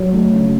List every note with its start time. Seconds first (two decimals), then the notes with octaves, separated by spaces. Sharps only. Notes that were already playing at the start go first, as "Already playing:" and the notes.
Already playing: F#3 C#5
0.13 A3
0.33 C#3